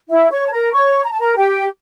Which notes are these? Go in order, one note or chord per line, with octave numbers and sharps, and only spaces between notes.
E4 E5
C#5 C#6
A5
A#4 A#5
C#5 C#6
A#5
A5
A#4 A#5
G4 G5